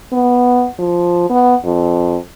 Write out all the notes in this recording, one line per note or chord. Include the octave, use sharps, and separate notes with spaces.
B3
F3
B3
F2